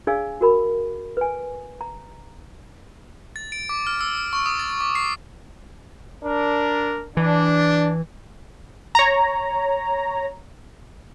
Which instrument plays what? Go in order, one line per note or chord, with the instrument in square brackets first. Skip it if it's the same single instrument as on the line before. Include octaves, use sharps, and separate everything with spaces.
[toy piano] D4 G#4 D5 F5 G#5 E6
F#4 A#4 B5
B4 G#5
A#5
[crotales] A6
D7
D6
F6
E6
F6
C#6
D#6
A6
D6
C7
[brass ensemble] D4 A#4
[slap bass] E3 [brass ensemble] D4
[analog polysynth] C#5 A#5